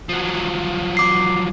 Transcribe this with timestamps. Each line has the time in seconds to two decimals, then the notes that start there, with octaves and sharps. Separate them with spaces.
0.09 F3 F#3
0.97 D6 C7